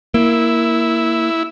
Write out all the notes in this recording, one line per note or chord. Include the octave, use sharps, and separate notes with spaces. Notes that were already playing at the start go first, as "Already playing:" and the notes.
A#3 E4